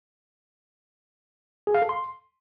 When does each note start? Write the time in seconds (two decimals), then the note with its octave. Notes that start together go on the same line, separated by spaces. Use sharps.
1.67 G#4
1.74 F5
1.82 A4
1.89 C6